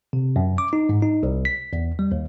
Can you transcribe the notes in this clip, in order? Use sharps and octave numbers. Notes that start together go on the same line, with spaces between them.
C3
F#2
D6
D#4
G#2
D#4
C2
B6
E2
G3
D#2